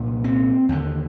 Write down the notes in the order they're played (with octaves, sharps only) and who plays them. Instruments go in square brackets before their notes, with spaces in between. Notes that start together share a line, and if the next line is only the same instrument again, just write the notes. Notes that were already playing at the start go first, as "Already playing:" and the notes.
Already playing: [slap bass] C2 A#2
C4
D#2 D3